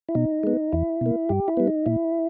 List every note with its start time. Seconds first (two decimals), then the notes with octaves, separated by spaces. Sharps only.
0.09 E4
0.15 B2 D#4
0.43 G#3 B3
0.72 E2 E4
1.01 B2 A#3
1.29 G2 G4
1.48 E4
1.57 G3 B3
1.67 D#4
1.86 A#2 E4